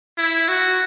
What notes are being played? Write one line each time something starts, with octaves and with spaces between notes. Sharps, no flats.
E4
F#4